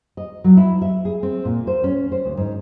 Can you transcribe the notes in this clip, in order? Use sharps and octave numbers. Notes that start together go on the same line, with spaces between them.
D#5
F#3
E4
E5
G#4
C4
A#2
C5
C#4
C5
D2
G#2